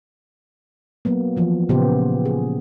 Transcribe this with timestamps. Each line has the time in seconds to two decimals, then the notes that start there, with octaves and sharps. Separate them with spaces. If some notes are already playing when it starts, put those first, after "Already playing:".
1.05 F#3 A#3 B3
1.36 E3 F3
1.69 A#2 C#3 A#3 B3 G4 C5
2.25 G#4